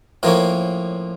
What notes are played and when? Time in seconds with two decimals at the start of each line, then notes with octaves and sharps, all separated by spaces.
0.23 A2 F3 A#3 C#4 A#4